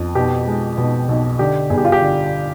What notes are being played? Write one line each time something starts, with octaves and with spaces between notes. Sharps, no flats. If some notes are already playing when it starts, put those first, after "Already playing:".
Already playing: F2
B2 G4
G#3
B2
B1
D3 G4
G1 G#4
G4
F4
G4
D3